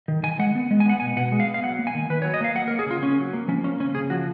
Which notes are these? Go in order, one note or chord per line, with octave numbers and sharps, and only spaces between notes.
D#3
D#3 G#5
G#3 F#5
B3
G#3
G#5
B3 F#5
B2 G#5
B2 F#5
G#3
F5
B3
F5
F#3 F#5
A#3
G#5
D#3
D#3 B4
F#3 C#5
D#5
A#3 F5
F#3 F#5
A#4
A#3
G#4
C#3 F4
C#3 C#4
F#3
A#3
F3 C#4
A#3 C#4
C#3 C#4
C#3 G#4
F3 F#4